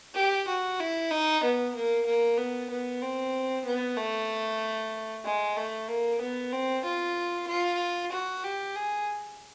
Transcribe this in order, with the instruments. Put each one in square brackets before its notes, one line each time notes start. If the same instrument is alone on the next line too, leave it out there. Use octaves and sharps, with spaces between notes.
[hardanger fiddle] G4
F#4
E4
D#4
B3
A#3
A#3
B3
B3
C4
B3
A3
G#3
A3
A#3
B3
C4
F4
F4
F#4
G4
G#4